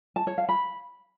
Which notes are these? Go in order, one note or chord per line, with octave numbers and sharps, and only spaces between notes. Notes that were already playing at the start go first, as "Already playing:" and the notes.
A5
C#5
F5
B5